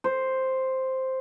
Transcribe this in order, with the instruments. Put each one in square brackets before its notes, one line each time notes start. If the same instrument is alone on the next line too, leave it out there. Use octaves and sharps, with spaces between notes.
[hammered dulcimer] C5